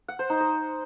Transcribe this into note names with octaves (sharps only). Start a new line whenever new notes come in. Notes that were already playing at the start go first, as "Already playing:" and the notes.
F#5
C5
D#4
D#5